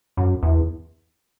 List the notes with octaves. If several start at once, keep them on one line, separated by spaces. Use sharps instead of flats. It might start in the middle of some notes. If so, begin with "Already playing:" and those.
F#2
E2